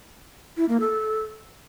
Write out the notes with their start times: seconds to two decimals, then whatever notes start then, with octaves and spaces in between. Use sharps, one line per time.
0.57 E4
0.69 A#3
0.80 A4